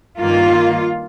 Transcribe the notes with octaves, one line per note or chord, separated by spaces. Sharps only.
G2 D#3 A#3 F4